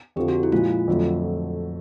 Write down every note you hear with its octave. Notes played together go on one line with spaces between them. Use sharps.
F2 D3 F3 G4
F#4
E4
A#2 F3 G#3 F4
F2 D3 F#3 A3